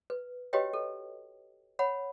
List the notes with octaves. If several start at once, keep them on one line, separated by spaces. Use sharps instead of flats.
B4
F#4 G4 B4 C#5 D#5 G5
A4
C#5 F#5 B5